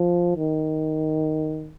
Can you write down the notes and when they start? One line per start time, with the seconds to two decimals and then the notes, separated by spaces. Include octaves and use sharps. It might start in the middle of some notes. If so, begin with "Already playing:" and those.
Already playing: F3
0.37 D#3